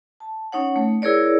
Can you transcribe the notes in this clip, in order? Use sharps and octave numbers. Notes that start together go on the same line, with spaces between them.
A5
C#4 D#4 C#5 F#5
A3
E4 G#4 A#4 C#5 D5